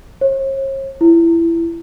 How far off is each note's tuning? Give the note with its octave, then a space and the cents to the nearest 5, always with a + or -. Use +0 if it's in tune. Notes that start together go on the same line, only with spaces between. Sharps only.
C#5 -45
E4 +20